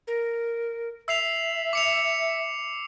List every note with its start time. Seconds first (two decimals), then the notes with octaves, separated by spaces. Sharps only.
0.07 A#4
1.08 E5 E6 C7 F7
1.73 D6 C#7 F7